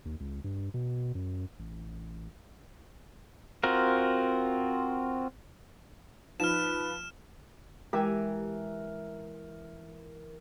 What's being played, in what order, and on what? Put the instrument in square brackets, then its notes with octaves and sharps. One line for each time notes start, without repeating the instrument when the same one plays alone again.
[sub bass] D#2
C#2
G2
B2
F#2
A1
[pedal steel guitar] C4 F4 F#4 A#4
[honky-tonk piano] F3 [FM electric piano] D#4 [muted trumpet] B4 [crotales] F6 E7
[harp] E3 E5 G#5 [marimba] G#3 [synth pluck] G4 [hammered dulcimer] A#4